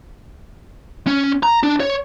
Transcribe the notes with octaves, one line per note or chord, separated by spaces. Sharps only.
C#4
A#5
D4
C#5